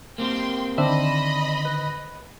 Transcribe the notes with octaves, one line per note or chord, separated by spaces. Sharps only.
A#3 C4 G4 G5 C6
D3 D#3 C4 D4 C5 D#5 E5 B5
B4